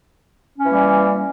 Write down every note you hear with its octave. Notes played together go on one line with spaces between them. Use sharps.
E3 G3 A#3 C#4